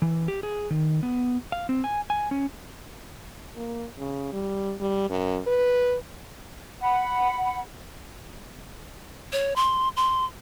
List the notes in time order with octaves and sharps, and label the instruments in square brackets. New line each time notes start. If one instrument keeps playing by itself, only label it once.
[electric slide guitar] E3
G4
G#4
D#3
B3
F5
C4
G#5
G#5
C#4
[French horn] A#3
C#3
G3
G3
F#2
B4
[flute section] F#5 B5
[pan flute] C#5
C6
C6